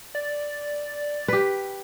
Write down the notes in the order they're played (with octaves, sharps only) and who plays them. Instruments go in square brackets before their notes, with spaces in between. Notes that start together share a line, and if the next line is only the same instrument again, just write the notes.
[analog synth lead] D5
[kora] G4 B4